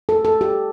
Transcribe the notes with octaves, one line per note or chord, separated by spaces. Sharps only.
A4
A4
G4